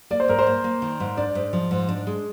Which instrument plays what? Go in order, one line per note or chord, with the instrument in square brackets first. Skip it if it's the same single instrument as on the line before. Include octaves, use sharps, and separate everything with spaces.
[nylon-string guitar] A#3 [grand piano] D5
[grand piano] C5
[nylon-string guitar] G#2 [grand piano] A#4
[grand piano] C5
[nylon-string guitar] A#3
A#3
D#3
G#2
[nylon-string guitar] D4 [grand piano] D5
[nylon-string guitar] G#2
F3
G#2
D4
G#3